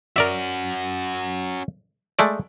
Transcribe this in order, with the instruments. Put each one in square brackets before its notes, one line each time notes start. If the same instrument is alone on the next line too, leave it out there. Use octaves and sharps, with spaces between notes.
[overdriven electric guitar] C#4 F#4 [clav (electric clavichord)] A#4 D5 E5
[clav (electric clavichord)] G#3 A3 D5